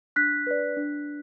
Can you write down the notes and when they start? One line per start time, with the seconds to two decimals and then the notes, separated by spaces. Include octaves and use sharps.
0.16 D4 F#6 B6
0.47 B4 D5
0.77 D4